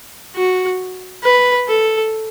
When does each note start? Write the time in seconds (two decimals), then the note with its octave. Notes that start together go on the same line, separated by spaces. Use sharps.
0.36 F#4
1.24 B4
1.68 A4